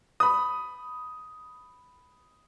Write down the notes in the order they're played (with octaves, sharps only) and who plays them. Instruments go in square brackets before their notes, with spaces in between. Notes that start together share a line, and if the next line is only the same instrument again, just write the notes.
[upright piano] B5 D#6